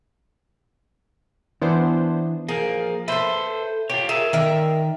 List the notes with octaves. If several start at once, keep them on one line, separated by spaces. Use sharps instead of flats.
E3 B3 D4 C5
F3 A#3 G#4
A4 B4 C5 E5
F4 G4 C#5
G#4 A#4 E5
D#3 A#4 D5 E5